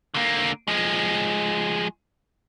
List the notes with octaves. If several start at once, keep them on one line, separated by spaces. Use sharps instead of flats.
D3 A#3
F3 G#3